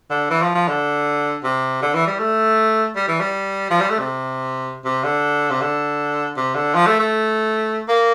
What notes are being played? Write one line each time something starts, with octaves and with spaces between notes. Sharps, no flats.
D3
E3
F3
F3
D3
C3
D3
E3
G3
A3
G3
E3
G3
F3
G3
A3
C3
C3
D3
C3
D3
C3
D3
F3
A3
A3
A#3